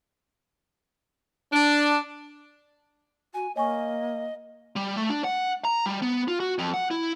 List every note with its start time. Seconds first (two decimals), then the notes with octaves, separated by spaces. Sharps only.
1.53 D4
3.34 F#4 G#5
3.56 A#3 C#5 D#5 G#5 C#6
4.76 G3
4.96 A3
5.09 D4
5.24 F#5
5.65 A#5
5.86 G3
6.02 B3
6.28 F4
6.40 F#4
6.58 F2
6.74 F#5
6.91 E4